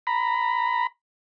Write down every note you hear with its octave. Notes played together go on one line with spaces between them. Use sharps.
A#5 B5